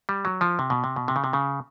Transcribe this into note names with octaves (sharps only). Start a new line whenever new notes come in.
G3
F#3
F3
C3
B2
C3
B2
C3
C#3
C3
C#3